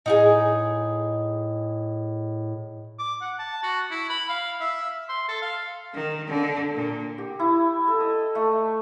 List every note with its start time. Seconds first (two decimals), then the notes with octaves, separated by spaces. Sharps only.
0.06 A2 D#4 F#4 G#4
2.99 D6
3.21 F#5
3.39 A5
3.63 F#4
3.91 E4
4.10 B5
4.29 F5
4.61 E5
5.09 C6
5.29 A4
5.42 F5
5.93 D#3
6.27 D3
6.75 A#2
7.18 G4
7.39 E4
7.88 A4
8.00 D#5
8.35 A3